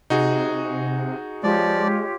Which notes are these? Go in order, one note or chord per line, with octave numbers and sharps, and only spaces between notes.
C3 D#4 F#4 G#4
F3 G#3 F4 G4 C#5 D5